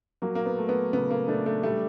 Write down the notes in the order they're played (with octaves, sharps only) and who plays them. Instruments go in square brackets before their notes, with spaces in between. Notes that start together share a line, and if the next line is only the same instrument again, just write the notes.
[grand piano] F#3 [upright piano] A#3
[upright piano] A#3
B3
[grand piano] A3
[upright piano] B3
[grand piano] C#3 [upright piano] B3
[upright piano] A#3
[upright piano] A3 [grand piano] D4
[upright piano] A3
[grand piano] G3 [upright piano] A3